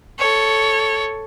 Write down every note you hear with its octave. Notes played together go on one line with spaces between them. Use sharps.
A4 C#5